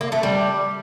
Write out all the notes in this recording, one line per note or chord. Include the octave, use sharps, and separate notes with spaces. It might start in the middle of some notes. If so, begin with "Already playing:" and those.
A#3
A3
G3